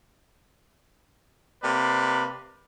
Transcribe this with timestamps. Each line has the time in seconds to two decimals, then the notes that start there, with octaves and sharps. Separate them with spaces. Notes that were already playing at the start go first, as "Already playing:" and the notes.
1.62 C3 A#3 B4 D5